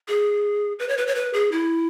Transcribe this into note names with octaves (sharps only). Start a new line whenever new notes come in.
G#4
B4
C#5
B4
C#5
B4
G#4
E4